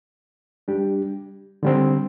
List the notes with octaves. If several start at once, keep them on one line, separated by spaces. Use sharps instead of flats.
G3 D4 G4
D3 G3 C4